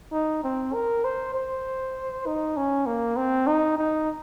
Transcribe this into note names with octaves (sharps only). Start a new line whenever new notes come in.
D#4
C4
A#4
C5
C5
D#4
C#4
A#3
C4
D#4
D#4